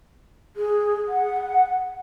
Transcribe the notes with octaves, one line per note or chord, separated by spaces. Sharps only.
G#4
F#5